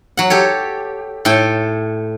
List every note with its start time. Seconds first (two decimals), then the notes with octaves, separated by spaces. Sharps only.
0.17 F#3 F#5
0.30 G4 A4 C#5
1.25 A2 A4 G5